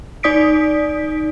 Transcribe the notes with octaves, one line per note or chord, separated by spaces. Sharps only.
D#4 D5 D#6 B6 D7